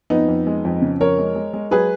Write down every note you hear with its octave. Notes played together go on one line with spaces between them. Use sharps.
F2 B3 D#4
F2
G#3
F2
C#3
F2 A#4 C#5
G#3
G#3
G#3
F#3 G#4 B4